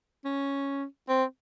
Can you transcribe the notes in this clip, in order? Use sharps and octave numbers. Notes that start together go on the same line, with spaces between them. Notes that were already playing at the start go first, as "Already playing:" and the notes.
C#4
C4